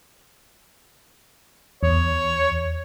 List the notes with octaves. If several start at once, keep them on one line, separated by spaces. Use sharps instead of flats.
E2 C#5